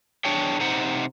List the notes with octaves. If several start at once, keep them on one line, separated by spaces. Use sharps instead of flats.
E2 D4 G#4 C#5 G5
C3 D#4 C5 F#5